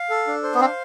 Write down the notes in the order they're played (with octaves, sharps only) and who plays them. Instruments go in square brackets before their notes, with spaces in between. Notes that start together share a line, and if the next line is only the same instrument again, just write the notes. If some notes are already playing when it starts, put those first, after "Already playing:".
Already playing: [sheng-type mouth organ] F5
A4
D4
C5
[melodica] B3
[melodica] C4 [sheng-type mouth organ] F5